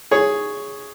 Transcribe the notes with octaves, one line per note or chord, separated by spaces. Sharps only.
G#4 C#5